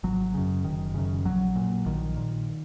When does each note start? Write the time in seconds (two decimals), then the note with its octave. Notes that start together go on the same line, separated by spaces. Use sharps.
0.03 G#1 F#3
0.34 F#2 C#3
0.64 F#1 D#3
0.95 F#2 C#3
1.25 A#1 F#3
1.56 A#2
1.86 A#1 D#3
2.17 A#2